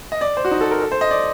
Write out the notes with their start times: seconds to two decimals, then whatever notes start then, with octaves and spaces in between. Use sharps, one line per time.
0.12 D#5
0.21 D5
0.37 C5
0.45 F#4
0.51 D#4
0.61 A4
0.71 A#4
0.82 A4
0.92 C5
1.01 D#5
1.11 D5